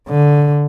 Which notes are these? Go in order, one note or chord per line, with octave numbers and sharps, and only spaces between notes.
D3